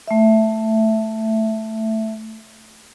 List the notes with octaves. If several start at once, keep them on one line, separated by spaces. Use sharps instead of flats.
A3 E5